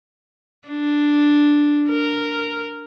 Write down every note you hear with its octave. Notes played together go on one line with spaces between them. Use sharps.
D4
A#4